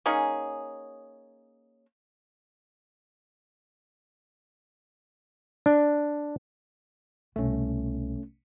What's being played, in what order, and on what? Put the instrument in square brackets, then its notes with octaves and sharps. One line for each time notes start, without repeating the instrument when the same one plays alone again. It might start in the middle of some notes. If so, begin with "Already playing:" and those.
[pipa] A#3 C#4 D#4 G#4
[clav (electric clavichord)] D4
[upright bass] C2 B2 [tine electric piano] A3 C#4